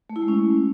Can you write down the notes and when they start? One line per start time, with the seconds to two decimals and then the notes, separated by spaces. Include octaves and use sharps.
0.10 A3
0.16 E4
0.22 G#3
0.28 C#4